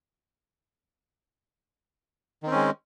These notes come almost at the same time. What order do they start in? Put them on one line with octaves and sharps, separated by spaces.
D#3 C4 C#4 G#3